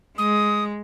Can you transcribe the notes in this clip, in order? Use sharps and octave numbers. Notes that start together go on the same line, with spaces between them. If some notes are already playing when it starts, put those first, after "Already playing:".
G#3 D#6